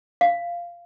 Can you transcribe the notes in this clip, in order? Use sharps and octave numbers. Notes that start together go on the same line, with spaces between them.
F5